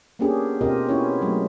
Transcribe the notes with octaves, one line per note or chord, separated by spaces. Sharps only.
A#3 B3 C#4 D4 G4 G#4
B2 C4 F4 G4 A#4 D#5
B3 C#4 E4 F4 C#5
F#3 G#3 A3